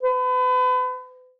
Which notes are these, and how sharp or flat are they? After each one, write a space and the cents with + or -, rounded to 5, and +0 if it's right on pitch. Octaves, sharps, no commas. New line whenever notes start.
B4 +35